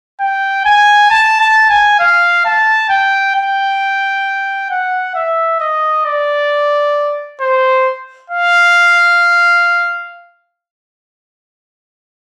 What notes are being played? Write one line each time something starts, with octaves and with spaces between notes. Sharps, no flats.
G5
G#5
A5
A5
G#5
F5
A5
G5
G5
F#5
E5
D#5
D5
C5
F5